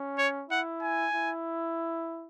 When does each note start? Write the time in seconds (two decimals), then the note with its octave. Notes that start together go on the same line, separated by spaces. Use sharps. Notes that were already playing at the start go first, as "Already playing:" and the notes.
Already playing: C#4
0.18 C#5
0.50 E4 F#5
0.82 G#5
1.14 E4